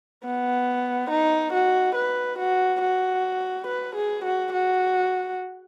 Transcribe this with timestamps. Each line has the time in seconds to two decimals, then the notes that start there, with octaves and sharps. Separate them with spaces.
0.24 B3
1.10 D#4
1.53 F#4
1.95 B4
2.38 F#4
2.81 F#4
3.67 B4
3.95 G#4
4.24 F#4
4.53 F#4